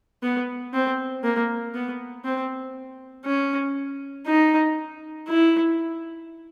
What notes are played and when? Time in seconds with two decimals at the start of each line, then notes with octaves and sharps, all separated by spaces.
0.23 B3
0.73 C4
1.23 A#3
1.75 B3
2.25 C4
3.25 C#4
4.26 D#4
5.28 E4